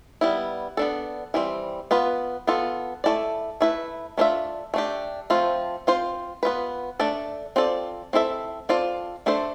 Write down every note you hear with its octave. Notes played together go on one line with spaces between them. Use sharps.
G3 B3 E4
B3 D4 A4
E3 G3 C4
B3 F4 B4
B3 F4 A4
A3 E4 A4 D5
A3 E4 B4
A3 D4 F4 C5 E5
A3 D4 G4
F3 A3 C4 F4
C4 F4 C5
B3 F4 B4
A3 D4 A4 D5
C4 F4 A4 D5
C4 E4 A4 E5
C4 F4 A4 D5
A3 D4 A4 C5